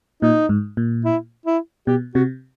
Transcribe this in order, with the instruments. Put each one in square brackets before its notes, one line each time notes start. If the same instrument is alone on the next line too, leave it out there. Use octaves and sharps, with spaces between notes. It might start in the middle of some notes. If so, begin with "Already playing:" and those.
[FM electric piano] A#2 [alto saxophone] D#4
[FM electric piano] G#2
A#2
[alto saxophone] E4
E4
[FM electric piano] B2 [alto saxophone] G4
[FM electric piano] C3 [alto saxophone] F#4